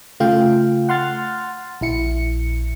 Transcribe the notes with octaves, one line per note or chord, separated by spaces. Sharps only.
C#3 A3 F4 F5 G5
F#5 C6 F6 A6
A#1 E4 C#7